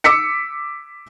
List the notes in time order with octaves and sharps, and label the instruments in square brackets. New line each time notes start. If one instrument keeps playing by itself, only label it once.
[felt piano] D6 E6 B6 C#7